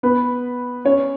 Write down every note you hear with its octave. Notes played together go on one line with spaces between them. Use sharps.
B3 B4
C#4 C#5